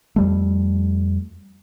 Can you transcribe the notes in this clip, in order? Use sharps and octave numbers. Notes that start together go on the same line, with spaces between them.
F2 G3 A3